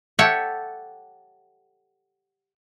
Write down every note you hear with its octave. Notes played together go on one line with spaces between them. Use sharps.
G4 A4 C#5 E5 F#5